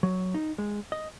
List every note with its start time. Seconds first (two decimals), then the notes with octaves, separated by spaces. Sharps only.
0.03 F#3
0.34 D#4
0.58 G#3
0.92 D#5